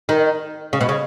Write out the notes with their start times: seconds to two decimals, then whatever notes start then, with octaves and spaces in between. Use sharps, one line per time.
0.09 D#3
0.73 C#3
0.81 B2
0.89 C#3